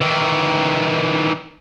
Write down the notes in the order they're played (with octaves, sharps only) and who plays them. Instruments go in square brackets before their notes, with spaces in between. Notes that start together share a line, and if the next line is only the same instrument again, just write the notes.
[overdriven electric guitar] D#3 E3